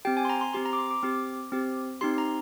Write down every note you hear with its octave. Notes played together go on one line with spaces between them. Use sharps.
C4 G4 G5
G#5
C6
A#5
C6
C4 G4 C6
A#5
D6
C6
D6
C4 G4
C4 G4
C4 D#4 G4 C6
A#5